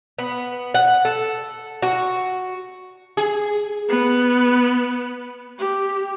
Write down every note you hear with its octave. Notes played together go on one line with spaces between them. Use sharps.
B3
F#5
A4
F#4
G#4
B3
G4